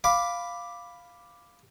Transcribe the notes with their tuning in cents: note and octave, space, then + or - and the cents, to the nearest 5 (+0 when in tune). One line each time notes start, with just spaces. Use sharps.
F5 +0 B5 +0 D6 +0